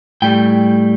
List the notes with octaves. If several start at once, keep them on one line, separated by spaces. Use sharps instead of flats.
A2 G3 G5